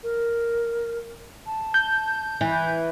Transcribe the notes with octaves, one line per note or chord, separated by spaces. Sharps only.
A#4
A5
G6
E3